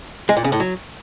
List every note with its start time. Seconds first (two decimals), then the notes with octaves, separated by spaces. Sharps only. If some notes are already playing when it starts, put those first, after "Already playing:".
0.29 G#3
0.37 A#2
0.44 C#3
0.52 A2
0.60 F#3